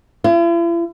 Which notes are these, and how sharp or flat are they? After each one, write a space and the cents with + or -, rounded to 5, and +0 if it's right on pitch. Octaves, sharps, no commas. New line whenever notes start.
E4 +45